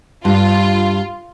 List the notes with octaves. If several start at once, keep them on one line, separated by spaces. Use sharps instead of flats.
G2 G3 F4